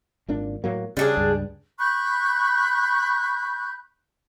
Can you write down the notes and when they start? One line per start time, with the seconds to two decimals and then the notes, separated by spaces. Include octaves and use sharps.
0.29 G#1 A#2 D4
0.64 A2 F#3 A#3
0.97 C#3 G3 D4 G#4
1.17 C#2 G2
1.78 B5 C#6 F#6 G6